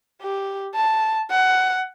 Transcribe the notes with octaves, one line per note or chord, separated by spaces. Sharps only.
G4
A5
F#5